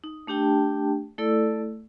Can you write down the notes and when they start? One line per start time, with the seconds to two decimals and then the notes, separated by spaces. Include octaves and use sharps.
0.04 D#4
0.27 A3 D4 G4 G5 A5
1.18 A3 E4 A4 D5 E6